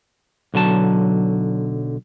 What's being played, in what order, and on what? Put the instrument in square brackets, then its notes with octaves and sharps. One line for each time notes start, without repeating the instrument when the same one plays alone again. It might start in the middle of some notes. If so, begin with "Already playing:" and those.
[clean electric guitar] B1 D3 F#3 A5